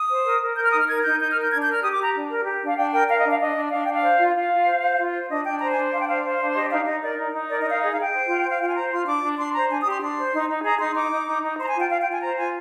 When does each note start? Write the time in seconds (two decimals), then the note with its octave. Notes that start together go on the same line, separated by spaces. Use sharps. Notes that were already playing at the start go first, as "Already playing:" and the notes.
Already playing: D#6
0.09 C5
0.25 A#4
0.41 A#4
0.56 A#4 G6
0.65 F6
0.72 D#4 D#6
0.79 F6
0.88 A#4 G#6
1.03 D#4 G6
1.19 D#4 G6
1.30 F6
1.35 A#4
1.41 G6
1.51 D4 G#6
1.62 G6
1.67 A#4
1.72 F6
1.82 G4 D#6
1.93 D6
1.98 G4 A#5
2.14 D4
2.30 A#4
2.45 G4
2.61 D4
2.67 F5
2.76 D4 G5
2.92 A#4 G5
3.08 A#4 F5
3.18 D#5
3.23 D4
3.29 F5
3.39 D4 D#5
3.55 D4
3.71 D4 F5
3.84 D4 G5
3.94 F5
4.03 C5
4.18 F4
4.34 F4 F5
4.51 F4
4.65 C5
4.81 C5
4.97 F4
5.13 C5
5.29 D4 D#5
5.45 D4 G5
5.60 C5 A#5
5.71 G#5
5.76 D4
5.92 D4 F5
6.00 G5
6.07 C5 F5
6.23 C5
6.38 D4
6.54 G4 D#5
6.70 D#4 F5
6.86 D#4 D#5
7.02 A#4 D5
7.18 D#4
7.33 D#4
7.49 A#4 D5
7.60 D#5
7.65 D#4
7.70 F5
7.80 G#4 D#5
7.91 F5
7.97 G#4 G5
8.13 C5
8.27 F4
8.44 C5
8.52 F5
8.60 F4 G5
8.68 G#5
8.75 C5 A#5
8.91 F4 C6
9.06 D4 D6
9.23 D4
9.38 D4 C6
9.53 C5 A#5
9.70 D4 G#5
9.81 D#6
9.85 G4
9.90 C6
10.00 D4 C6
10.16 C5
10.32 D#4
10.49 D#4
10.63 G#4 A#5
10.80 D#4 C6
10.95 D#4 D6
11.11 D#4
11.27 D#4
11.43 D#4
11.58 C5 C6
11.63 A#5
11.68 G#5
11.75 F4
11.80 G5
11.90 F4 F5
12.00 G5
12.06 F4 G#5
12.22 C5 A#5
12.37 F4 G#5